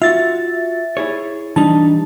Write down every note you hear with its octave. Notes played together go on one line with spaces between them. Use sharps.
F4 F#4 E5 A6
E4 G#4 C#5
E3 G3 D4 D#4 A5